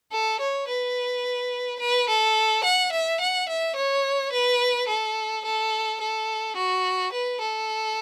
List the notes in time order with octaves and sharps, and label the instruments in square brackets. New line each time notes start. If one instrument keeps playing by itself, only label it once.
[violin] A4
C#5
B4
B4
A4
F#5
E5
F#5
E5
C#5
B4
A4
A4
A4
F#4
B4
A4